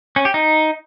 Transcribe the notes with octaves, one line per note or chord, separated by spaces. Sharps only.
C#4
G4
D#4